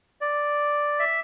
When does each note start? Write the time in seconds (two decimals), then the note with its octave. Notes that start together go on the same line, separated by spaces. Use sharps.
0.21 D5
0.99 E5